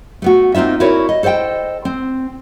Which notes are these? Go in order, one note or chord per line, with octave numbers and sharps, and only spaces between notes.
A3 B3 F#4
A#3 C4 D#4 F4 E5
E4 F#4 A#4 B4 C#5 D5
D#5
A4 C5 D#5 F5 G5
C4